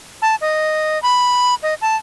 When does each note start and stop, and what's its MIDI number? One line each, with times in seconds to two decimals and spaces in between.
0.22 0.35 81
0.41 1.01 75
1.03 1.55 83
1.63 1.74 75
1.82 1.96 81